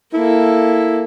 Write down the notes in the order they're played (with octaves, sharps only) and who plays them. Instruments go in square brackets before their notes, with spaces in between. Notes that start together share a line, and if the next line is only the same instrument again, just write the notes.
[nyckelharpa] A#3 A4 [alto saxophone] E4